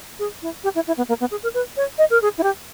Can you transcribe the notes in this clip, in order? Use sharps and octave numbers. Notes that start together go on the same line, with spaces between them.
G#4
E4
G4
E4
E4
B3
A#3
B3
G#4
A#4
B4
C#5
D#5
A#4
G#4
E4
G4